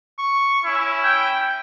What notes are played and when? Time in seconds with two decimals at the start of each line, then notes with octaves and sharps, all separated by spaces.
0.18 C#6
0.63 C#4 E4
1.03 G5